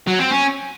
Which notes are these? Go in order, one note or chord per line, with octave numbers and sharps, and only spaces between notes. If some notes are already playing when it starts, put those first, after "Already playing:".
F#3
C4
C#4